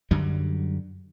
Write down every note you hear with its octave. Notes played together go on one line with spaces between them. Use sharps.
F#2 D3 F#3 G3